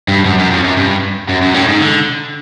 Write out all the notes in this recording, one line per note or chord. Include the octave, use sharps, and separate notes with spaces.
G2
F#2
F#2
F2
F#2
G2
F#2
F#2
A2
G#2
D3